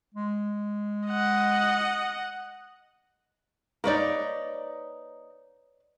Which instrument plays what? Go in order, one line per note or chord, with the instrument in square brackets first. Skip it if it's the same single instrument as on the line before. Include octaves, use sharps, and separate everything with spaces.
[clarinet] G#3
[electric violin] D#5 F#5
[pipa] A#3 D#4 [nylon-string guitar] B4 C#5 D5